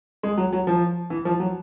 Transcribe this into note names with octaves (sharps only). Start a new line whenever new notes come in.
G#3
F#3
F#3
F3
E3
F3
F#3